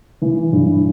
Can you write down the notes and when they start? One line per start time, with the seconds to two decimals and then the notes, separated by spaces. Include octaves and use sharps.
0.22 E3
0.52 G2